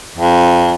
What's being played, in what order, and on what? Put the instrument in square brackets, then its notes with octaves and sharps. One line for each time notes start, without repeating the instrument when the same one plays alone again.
[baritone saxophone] F2